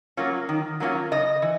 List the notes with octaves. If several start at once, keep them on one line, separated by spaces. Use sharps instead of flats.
F#3 A#3 C#4 F4
D#3
F#3 A#3 C#4 F4
C#3 D#5
E3